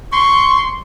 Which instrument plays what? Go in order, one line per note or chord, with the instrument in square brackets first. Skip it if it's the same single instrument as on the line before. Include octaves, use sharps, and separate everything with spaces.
[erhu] C6 [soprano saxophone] C#6